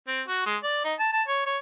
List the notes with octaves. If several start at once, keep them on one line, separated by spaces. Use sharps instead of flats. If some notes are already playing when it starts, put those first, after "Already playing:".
C4
F#4
G#3
D5
D#4
A5
A5
C#5
C#5